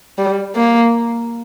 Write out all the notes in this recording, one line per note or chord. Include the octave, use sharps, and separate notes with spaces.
G3
A#3